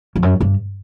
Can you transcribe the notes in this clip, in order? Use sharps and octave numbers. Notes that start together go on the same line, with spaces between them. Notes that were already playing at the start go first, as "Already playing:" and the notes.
F2
F#2
G2